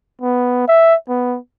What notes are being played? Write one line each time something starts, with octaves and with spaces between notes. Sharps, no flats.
B3
E5
B3